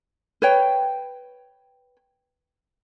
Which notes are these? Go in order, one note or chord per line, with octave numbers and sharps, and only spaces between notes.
B4 C#5 G5